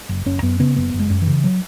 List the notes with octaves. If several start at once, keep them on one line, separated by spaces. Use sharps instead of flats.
F#1
F#1 C#4
F#2 B3
C#3 B3
F#1 B3
F#1
G#3
F#2
E3
C#3
F#3